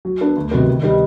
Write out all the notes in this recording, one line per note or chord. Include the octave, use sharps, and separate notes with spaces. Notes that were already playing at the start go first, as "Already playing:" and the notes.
F#3
B3 D4
D2
C3 D#3 F#3 B3
D#3
G3 B3 D#4